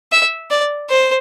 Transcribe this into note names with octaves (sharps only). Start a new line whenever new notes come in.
E5
D5
C5